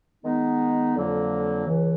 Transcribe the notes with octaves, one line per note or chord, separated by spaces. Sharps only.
D#3 G#3 B3 D#4
F2 D3 F#3 A#3
C#2 C#3 E3